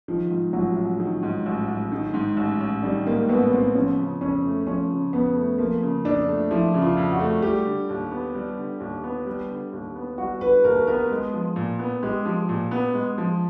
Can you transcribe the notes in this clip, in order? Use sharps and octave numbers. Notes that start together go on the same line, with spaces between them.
D#3 F3
G#2
A1 F#3
A1
D#3
G#2
A1
A1
D#3
G#2
A1
A1
D#3 G3
G#2 A#3
A1 B3
A1 C4
F3 C#4
C#3
F2 C#4
A3
F3 C#4
C#3
F2 B3
A3
F3 A#3
C#3
F2 D4
A3
F3 E4
C#3
F4
F2
F#4
A3
G3 G4
D3
D#2
B3
G3
D3
D#2
B3
G3
D3
D#2
B3
G3 F#4
D3 B4
D#2 A#4
B3 A#4
G#3
F3
A#2
B3
G#3 G4
F3
A#2
B3
G#3
F3